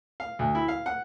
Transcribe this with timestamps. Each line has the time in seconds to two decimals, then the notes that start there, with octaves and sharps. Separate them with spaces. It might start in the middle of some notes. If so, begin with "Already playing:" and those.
0.20 F5
0.39 D2
0.55 E4
0.68 F5
0.86 F#5